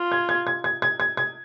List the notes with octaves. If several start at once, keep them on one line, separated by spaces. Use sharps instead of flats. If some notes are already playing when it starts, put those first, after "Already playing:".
Already playing: F4
G#6
G#6
G#6
G#6
G#6
G#6
G#6